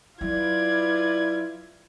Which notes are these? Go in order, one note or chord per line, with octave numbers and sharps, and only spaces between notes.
F#3 E4 F4 B4 D5 G#6